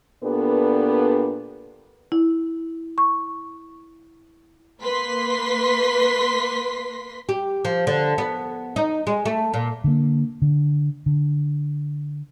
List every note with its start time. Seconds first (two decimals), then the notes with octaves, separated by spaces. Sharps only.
0.23 A#2 B3 D4 G4 A4 B4
2.12 E4
2.98 C#6
4.81 A#3 B4 C6 B6
7.29 G4
7.65 F3
7.87 D3
8.18 B3
8.76 D#4
9.07 G#3
9.25 A3
9.54 A#2
9.84 D3 A#3
10.42 D3
11.06 D3